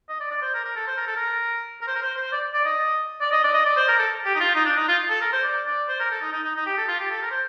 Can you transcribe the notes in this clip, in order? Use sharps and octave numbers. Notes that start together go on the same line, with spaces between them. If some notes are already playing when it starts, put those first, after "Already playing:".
D#5
D5
D5
C5
A#4
A#4
A4
C5
A#4
A4
A#4
A#4
C5
A#4
C5
C5
D5
D5
D#5
D5
D#5
D5
D#5
D5
C5
A#4
A4
G4
D#4
F4
D#4
D4
D#4
F4
A4
A#4
C5
D5
D5
C5
A#4
A4
D#4
D#4
D#4
D#4
G4
A4
F4
G4
A4
A#4
C5